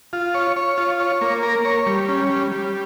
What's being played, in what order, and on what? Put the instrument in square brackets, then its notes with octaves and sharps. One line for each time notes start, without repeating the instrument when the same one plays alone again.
[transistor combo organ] F4
C#5
C#5
F4
C#5
A#3
A#4
C#5
G3
C#4
G3
G3